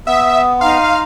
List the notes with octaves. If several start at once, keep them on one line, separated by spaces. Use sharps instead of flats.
B3 E5 D#6
D#4 F5 A#5 C6